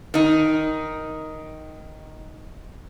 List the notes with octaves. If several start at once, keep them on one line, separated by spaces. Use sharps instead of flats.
D#3 D#4